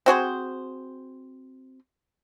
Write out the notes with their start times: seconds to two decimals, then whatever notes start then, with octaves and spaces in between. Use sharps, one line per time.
0.06 C4 F#4 G#4 C5